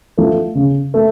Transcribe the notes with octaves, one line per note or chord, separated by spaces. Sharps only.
F3 A3
C#3
A3